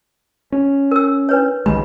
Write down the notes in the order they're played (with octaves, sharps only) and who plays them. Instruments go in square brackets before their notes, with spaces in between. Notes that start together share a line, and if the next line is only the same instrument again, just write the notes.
[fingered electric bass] C#4
[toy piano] A#4 E6
D4 B4 C#5
[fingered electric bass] B1 D#3 G#3 [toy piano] B5